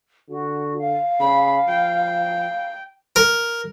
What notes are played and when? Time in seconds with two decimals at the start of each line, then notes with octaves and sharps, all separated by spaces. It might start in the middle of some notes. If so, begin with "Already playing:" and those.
0.30 D3 F#4
0.79 F5
1.20 C#3 B5
1.68 F3 G5
3.16 A#4